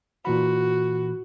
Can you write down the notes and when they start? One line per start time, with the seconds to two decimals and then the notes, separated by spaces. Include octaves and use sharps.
0.25 A#2 E3 F#4 B5